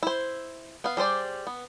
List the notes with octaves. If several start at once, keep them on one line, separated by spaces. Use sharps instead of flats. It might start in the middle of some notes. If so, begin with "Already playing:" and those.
E4 C5
B3 F5
G3 G#4 C5 D5
B3